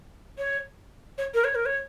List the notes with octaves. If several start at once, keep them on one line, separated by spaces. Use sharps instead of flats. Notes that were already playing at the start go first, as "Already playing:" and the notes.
C#5
C#5
A#4
C#5
A#4
C#5